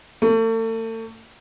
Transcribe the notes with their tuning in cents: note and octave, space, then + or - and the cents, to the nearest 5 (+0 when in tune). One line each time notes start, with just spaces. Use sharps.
A3 +40